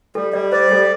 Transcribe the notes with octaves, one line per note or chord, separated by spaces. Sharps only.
G3 A4
G3 D5
C5 D5
G3 A4